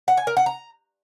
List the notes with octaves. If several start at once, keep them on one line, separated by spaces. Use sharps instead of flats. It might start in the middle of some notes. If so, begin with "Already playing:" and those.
F#5
G#5
A#4
F#5
A#5